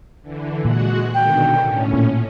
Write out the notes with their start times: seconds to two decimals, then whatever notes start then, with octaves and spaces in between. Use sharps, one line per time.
0.22 D3 E3
0.65 A#2 G#3 F#4 F#5
1.14 B2 D3 D#3 G5
1.60 A2 C#4
1.93 A#2